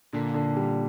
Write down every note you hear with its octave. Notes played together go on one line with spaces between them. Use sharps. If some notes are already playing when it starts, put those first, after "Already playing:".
A#2 D3
D3
G3